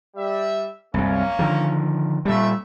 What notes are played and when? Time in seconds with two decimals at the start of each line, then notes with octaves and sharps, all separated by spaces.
0.15 G3 E5
0.94 C2 F#2 A#3 C#4
1.39 D3 D#3 F3
2.25 F2 A#2 G3 A3 E5